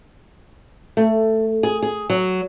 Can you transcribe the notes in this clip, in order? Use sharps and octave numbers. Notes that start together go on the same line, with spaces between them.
A3
G#4
G#4
F#3